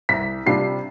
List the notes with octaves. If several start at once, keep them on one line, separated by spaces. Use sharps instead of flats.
C2 B6
C3 G3 D4 F4 C7